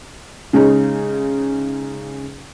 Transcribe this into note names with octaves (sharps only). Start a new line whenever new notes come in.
C#3 G#3 C#4 D#4